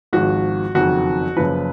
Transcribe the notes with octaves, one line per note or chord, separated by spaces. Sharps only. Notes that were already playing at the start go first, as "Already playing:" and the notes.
G#1 G#2 F3 F#4
F#1 F2 D#3 F#4
F#1 F#2 F3 B4